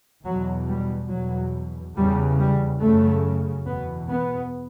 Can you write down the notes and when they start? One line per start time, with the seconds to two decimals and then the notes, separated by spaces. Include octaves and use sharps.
0.25 E2 B2 F#3
0.68 G3
1.10 E2 B2 F#3
1.96 E2 C#3 G3
2.39 G3
2.81 F#2 C#3 A3
3.66 E2 B2 B3
4.09 B3